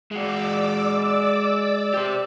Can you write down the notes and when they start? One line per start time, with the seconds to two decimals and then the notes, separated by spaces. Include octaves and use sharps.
0.11 G#3 F#4 D5 D6 E6
1.94 G4 C5